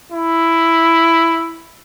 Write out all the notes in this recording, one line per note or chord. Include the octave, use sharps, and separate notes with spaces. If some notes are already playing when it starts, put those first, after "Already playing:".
E4